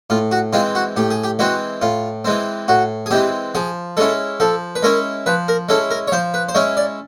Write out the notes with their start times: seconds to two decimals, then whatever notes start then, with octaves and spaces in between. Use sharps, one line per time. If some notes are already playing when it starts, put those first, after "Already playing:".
0.10 A2 F4
0.31 F#4
0.53 E3 G#3 C4 F4
0.75 F#4
0.96 A2 G4
1.10 G#4
1.24 G4
1.39 E3 G#3 C4 F#4
1.82 A2 F4
2.25 E3 G#3 C4
2.68 A2 F#4
3.06 G#4
3.11 E3 G#3 C4 G4
3.55 F3 G#4
3.97 G#3 C#4 E4 A4
4.40 F3 A4
4.76 B4
4.83 G#3 C#4 E4 A#4
5.26 F3 B4
5.48 A#4
5.69 G#3 C#4 E4 A4
5.91 A#4
6.08 C#5
6.12 F3 C5
6.34 B4
6.49 C5
6.55 G#3 C#4 E4 C#5
6.77 D5